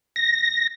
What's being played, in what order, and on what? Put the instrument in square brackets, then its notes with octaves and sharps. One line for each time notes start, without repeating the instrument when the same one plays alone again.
[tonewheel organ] A#6